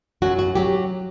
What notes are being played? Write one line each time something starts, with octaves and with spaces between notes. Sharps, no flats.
F#2 F#3 F#4
F#4
F#3 G4